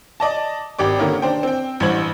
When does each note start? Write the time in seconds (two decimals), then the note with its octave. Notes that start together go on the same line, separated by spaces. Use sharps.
0.20 D5 D#5 A5
0.79 G#1 G4 D5 D6
0.99 D3 D#3 A#3 C#4
1.22 D4 C5 G5
1.43 C4 G5
1.80 A1 G2 E3 C5 G#6 F#7